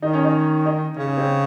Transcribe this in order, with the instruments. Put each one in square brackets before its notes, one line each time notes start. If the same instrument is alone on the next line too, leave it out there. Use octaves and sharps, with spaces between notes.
[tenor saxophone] D#3 [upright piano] D#4
[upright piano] C#4
D#4
D#4
[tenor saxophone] C#3 [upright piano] C#4
[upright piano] C#4
C4